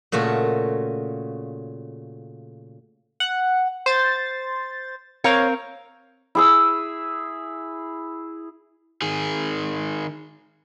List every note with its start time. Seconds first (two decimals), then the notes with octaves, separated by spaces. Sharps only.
0.12 A#2 C#3 A3 F#4
3.20 F#5
3.86 C5 A6
5.24 C4 A#4 C#5 F5
6.35 E4 G#4 E6
9.02 D#3 G#4